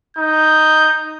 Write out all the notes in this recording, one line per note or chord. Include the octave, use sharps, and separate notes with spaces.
D#4 G6